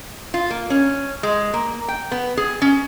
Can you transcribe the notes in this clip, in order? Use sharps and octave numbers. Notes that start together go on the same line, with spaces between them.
F4
A#3
C#4
G#3
A#3
G5
B3
G#4
C#4